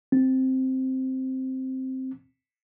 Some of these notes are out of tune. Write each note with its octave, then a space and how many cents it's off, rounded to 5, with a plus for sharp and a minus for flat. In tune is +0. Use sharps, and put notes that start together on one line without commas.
C4 +0